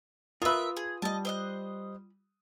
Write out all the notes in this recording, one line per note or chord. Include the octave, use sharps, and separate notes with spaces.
F4 A#4 B4 E5 D#6
G#4
G3 D#5 A5
C5 D#5 F#6